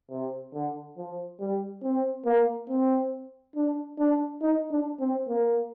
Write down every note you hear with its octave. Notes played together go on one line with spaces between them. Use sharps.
C3
D3
F3
G3
C4
A#3
C4
D4
D4
D#4
D4
C4
A#3